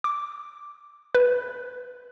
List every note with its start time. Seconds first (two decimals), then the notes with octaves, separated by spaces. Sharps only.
0.04 D6
1.15 B4